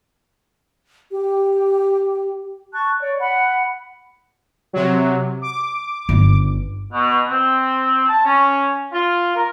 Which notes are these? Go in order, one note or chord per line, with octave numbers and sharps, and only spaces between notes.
G4
A5 C#6 F#6
C#5 D5
F#5 B5
C3 F#3
D6
G1 C#3
B2
C4
A5
C#4
F4
A#4